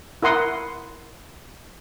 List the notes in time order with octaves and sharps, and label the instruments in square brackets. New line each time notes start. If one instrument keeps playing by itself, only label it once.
[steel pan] E4 A#4 F#5 C6 D#6